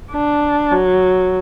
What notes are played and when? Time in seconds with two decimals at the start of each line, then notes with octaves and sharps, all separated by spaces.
0.12 D4
0.72 F#3